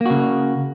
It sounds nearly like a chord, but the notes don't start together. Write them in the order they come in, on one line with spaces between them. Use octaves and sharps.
A#3 F#4 C#3